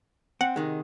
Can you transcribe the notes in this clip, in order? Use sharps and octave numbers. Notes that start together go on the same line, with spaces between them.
C4 F#5
C3 D#3 G#3